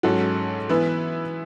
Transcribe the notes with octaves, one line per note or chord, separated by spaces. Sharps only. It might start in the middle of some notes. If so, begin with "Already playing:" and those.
G#2 F#3 C#4 F#4 A4
E3 B3 E4 B4